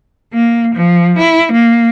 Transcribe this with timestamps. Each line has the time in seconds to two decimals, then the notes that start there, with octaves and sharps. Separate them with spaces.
0.33 A#3
0.75 F3
1.18 E4
1.53 A#3